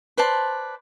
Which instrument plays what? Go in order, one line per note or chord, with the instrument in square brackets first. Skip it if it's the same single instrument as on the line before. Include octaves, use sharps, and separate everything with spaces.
[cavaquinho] B4 C5 D5 A5